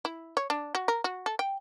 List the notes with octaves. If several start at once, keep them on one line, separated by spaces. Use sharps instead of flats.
E4
C#5
D4
F#4
A#4
F#4
A4
G5